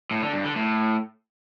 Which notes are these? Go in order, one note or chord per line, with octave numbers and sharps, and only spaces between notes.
A2
D3
G2
D3
A2